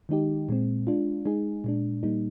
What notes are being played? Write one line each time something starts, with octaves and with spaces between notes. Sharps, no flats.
D#3 G#3 D#4 G4
A#2 G#3 C4
G#3 D4 F4
G#3 D#4 G#4
A#2 G#3 D4
A#2 G3 A#3 D#4